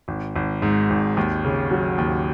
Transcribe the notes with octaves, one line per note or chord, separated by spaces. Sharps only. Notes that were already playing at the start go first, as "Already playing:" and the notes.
G#1
G#1
G#2
G#1
D#2
C#3
F#3
D#2